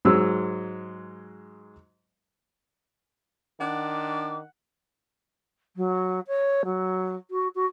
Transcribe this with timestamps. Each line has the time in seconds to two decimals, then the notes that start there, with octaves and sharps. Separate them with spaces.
0.05 G#2 F#3 G#3 E6
3.60 D#3 D4 F#5 D6
5.76 F#3
6.27 C#5
6.65 F#3
7.31 F#4
7.55 F#4